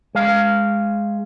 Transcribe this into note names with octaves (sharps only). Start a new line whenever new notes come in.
G#3 F5